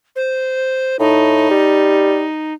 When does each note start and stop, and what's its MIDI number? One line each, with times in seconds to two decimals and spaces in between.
0.16 0.97 72
0.99 1.47 45
0.99 2.53 63
1.50 2.25 55